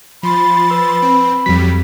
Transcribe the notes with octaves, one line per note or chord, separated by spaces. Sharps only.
F3 B5 C6 A6
B4 E6
C4
F2 F#3 G3 B6